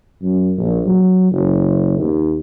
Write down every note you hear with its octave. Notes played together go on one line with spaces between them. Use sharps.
F#2
A#1
F#3
F#1
D#2